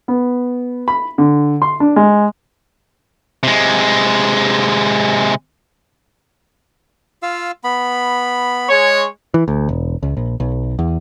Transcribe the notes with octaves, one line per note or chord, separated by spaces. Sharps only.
B3
B5
D3
C6
D4
G#3
C3 G#3
F4 F5 E6
B3 B5
G#3 C#5
E3
D2
E1
C#2
A#1
B1
E2